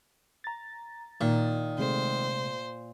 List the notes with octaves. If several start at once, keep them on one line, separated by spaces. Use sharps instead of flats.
A#5 A6
A#2 D#3
C3 G#3 A3 C5